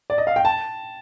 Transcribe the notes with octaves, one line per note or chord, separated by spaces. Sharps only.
D5
D#5
F5
G5
A5